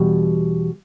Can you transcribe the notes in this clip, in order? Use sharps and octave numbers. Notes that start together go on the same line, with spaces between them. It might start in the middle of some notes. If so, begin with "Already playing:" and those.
Already playing: E2 B2 G3